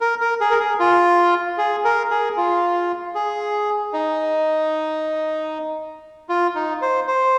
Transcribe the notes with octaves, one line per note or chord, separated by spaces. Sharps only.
A#4
A#4
G#4
A#4
G#4
F4
G#4
A#4
G#4
F4
G#4
D#4
F4
D#4
C5
C5